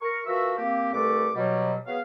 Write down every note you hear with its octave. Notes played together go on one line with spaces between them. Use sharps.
A#4 C#6
F3 F#4 A#4 B4 E5
A#3 C4 G4
C2 A3 A4 B4 D6
B2 F#3 G3
F#3 B3 G#4 B4 F5